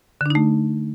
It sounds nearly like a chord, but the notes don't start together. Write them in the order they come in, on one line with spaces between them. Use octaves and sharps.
D3 D4 D#4 A3